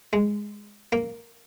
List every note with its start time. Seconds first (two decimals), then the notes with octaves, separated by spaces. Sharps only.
0.13 G#3
0.92 A#3